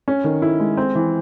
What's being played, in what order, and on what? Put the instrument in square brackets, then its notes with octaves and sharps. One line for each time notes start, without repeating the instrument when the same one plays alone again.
[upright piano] C#4
D#3
E4
G#3
C4
E3